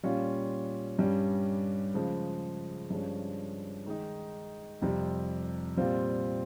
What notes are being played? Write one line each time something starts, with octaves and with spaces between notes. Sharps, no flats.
A#2 G3 C#4 F4
G2 G3 C#4
C#3 F3 G#3
G2 F3 G#3 C#4
D#3 G#3 D#4
F2 C3 G3
A#2 G3 C4 F4